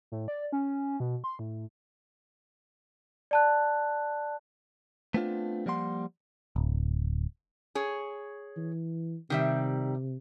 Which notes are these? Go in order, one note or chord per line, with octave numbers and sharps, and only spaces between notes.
A2
D5
C#4
B2
C6
A2
D5 A5 F#6
A3 B3 C4 D4 D#4 F4
F3 G3 A#3 F#5 C6
D1
G#4 C#5
E3
C3 D#3 G3 E5